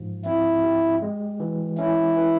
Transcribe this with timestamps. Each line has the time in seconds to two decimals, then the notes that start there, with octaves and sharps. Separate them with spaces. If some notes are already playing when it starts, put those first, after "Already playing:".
Already playing: G#2 F3
0.25 C4 E4
0.64 G4
1.02 G#3
1.40 E3
1.78 C#4 E4
2.16 E3